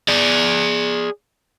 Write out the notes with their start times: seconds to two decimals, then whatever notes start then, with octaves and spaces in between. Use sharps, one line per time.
0.08 G#4 D5